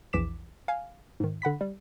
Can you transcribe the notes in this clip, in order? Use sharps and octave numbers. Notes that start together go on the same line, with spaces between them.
A#1 E2 E3 D6 B6 E7
F5 G#5
G#2 D#3
D3 F#5 B5 B6
G3